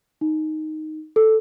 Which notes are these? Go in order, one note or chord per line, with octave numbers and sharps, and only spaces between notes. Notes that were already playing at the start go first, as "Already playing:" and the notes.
D#4
A4